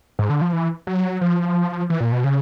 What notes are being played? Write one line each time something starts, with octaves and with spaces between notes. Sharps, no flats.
G#2
D3
F3
E3
F#3
F3
E3
A#2
B2
C#3